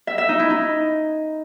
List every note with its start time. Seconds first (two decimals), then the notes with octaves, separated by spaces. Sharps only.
0.07 E5
0.18 E5
0.29 D#4
0.39 E4
0.50 D#4